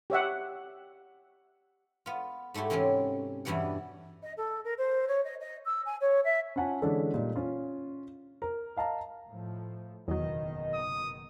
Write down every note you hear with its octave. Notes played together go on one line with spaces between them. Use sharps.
G4 C#5 E5 F#5
B3 F4
G#2 A3 E4 F#4 G4
C3 E3 G#3 C4 C#4
E2 G2 B2 E3 D5 F#5
D#5
A4
A#4
C5
C#5
D#5
D#5
E6
G#5
C#5
E5
C#4 F4 F#5 G#5 A5
D3 E3 G#3 C#4 D4 A4
A#2 G3 D#4
C#4 F4
A#4
D#5 F5 A5 A#5
A2 F3
F#1 E2 B2 D#3 F#3 D#5
D#6